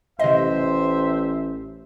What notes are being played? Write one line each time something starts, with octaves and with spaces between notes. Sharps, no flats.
A1 C3 C5 D#5 E5